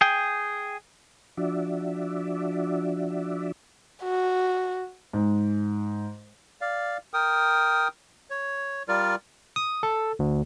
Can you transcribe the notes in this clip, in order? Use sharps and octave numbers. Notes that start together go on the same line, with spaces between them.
G#4 G5
F3 D4 F#4 D5 E5
F#4
G#2
D5 F5
A#4 G5 D#6
C#5
G3 F4 A#4 D5
D#6
A4
D2